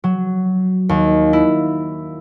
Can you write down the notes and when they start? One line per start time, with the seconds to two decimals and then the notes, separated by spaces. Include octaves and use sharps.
0.04 F#3
0.89 D#2
1.33 E4